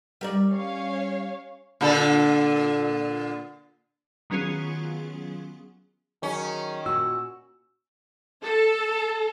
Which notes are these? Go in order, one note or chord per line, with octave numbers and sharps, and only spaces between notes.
G3 A#4 D5
C#4 C#5 F5
A#2 D3 A4
D#3 F#3 B3 C#4 F4 G#4
D#3 F#3 C#4 G#4
A#2 F#4 E6
A4